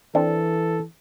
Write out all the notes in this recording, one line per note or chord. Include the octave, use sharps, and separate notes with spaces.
E3 C4 D4 A4